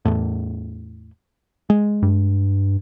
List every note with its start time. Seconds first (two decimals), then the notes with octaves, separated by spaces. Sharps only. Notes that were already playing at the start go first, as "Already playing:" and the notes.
0.05 E2 A2
1.70 G#3
2.02 G2